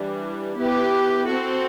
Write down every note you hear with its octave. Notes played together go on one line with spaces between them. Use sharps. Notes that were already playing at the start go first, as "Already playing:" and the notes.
Already playing: E3 G3 D4
B3 E4 G4 B4
C4 F#4 A4